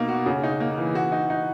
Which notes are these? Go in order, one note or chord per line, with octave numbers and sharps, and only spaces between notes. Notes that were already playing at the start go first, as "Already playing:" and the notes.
Already playing: B2 A#3 D#4
F#4
C#3
D#4
A#3
E3
F#4
D#4
D#4